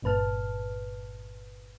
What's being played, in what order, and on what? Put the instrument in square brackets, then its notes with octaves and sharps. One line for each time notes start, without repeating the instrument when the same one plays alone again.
[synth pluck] G1 G2 A#2 B4 A5 F6